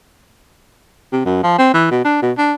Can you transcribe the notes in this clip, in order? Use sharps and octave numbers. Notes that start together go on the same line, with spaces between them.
C3
F#2
F3
C4
E3
B2
D4
B2
D4